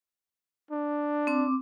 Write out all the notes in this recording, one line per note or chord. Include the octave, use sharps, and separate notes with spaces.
D4
C4 D6